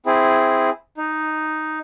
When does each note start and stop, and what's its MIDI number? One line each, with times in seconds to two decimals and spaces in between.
0.06 0.70 60
0.06 0.70 64
0.06 0.70 68
0.97 1.79 63